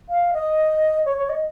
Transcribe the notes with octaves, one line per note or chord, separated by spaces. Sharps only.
F5
D#5
C#5
C#5
D#5